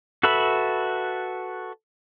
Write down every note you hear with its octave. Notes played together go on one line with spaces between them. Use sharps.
F#4 A4 B4 E5 B5